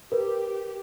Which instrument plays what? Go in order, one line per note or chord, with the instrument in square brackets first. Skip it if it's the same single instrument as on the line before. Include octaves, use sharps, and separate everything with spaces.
[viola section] G4 [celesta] A#4 B4